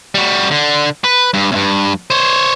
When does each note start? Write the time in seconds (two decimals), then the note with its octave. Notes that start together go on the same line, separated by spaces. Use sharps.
0.15 G3 F#4
0.51 D3
1.04 B4
1.34 G2
1.52 E2 G2
2.10 C5 C#5